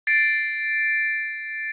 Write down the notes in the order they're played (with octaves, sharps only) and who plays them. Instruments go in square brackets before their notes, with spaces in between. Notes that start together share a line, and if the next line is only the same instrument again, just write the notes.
[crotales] A6 C7 D7